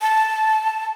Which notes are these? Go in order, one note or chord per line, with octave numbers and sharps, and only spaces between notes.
A5